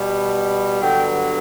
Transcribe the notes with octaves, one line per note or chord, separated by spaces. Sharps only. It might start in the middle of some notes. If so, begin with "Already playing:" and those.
Already playing: B2 G3 B3
G2 D3 F#3 B3 G5